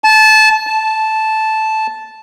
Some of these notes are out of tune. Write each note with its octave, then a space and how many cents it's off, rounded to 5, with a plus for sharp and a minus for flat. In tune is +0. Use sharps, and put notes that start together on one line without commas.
A5 -20
A5 -10